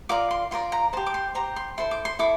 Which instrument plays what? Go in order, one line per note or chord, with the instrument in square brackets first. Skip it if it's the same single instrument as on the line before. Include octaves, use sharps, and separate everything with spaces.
[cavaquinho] F4 A#4 D5 D6
C6
F4 A#4 D5 C6
A#5
G4 C5 A5
D6
C6
G4 C5 A#5
C6
E4 A4 C5 C6
D6
C6
E4 A4 D6